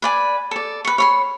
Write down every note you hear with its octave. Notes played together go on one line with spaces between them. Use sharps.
B4 D5 G#5
A4 D5
B4 C#6
C#5 B5 C6